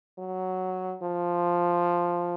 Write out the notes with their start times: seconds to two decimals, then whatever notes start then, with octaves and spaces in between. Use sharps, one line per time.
0.19 F#3
1.02 F3